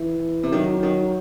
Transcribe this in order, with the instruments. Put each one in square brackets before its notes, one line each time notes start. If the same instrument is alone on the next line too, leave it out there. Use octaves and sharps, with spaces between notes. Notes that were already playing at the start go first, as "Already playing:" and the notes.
Already playing: [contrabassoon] E3
[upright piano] C3
[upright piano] D#3 [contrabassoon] F#3
[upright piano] D#3